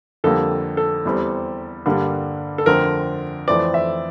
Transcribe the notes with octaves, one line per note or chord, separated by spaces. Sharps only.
F2 D3 G3 A#3 A4
A4
E2 E3 G3 C4
G2 D3 G3 A#3 D4
A4
F2 D3 A3 C4 A#4
F2 E3 A3 C4 D5
E5